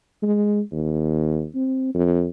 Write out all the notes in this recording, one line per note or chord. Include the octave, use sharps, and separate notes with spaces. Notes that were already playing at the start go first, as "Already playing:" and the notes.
G#3
D#2
C4
F2